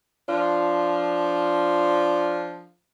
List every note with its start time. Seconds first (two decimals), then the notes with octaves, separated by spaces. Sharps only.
0.28 F3 D4 F4